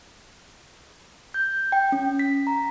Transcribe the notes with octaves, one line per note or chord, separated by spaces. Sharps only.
G6
G5
C#4
B6
A#5